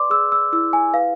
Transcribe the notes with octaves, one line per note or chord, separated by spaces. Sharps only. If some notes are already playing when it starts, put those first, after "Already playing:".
Already playing: B4 D5 C6 D6
G#4 E6
E6
E4 E6
G#5
B4 F5